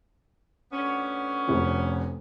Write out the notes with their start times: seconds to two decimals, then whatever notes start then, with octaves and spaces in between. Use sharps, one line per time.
0.72 D2 B3 C#4
1.47 F1 F2